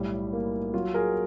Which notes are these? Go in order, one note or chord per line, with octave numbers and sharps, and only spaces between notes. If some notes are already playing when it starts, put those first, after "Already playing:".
Already playing: B1 A2 G3 E4
A#3
F#3 F4
G#4 A#4